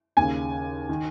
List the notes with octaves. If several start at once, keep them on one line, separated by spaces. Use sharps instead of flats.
D#2 C#3 G#5
D#3